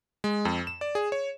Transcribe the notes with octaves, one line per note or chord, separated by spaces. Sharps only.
G#3
F2
E7
D5
G#4
C#5